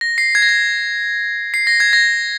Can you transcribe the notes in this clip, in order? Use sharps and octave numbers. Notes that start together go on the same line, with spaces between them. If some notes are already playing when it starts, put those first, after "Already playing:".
A#6
C7
G#6
A#6
G#6
C7
A#6
G#6
A#6